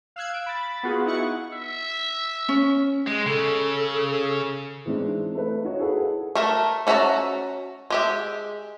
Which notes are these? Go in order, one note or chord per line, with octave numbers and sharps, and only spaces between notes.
F5 E6 F#6 G#6
E6 D7
B5 A6
B3 F4 F#4 G#4
D#4 E4 F#5 C#6
E5
C#4
G#3
C#3 A4
E3 G#3 C4 D4 D#4
A3 B4
D#4 F#4 C#5
E4 G#4 A4 B4 F#5
A3 A#4 E5
C#4 F#4 E5 A5 A#5
G#3 G4 E5